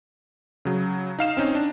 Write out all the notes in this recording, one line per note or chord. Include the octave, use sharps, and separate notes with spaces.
C#3 F#3
D#4 F5 E7
C4 C#4 D#4
D4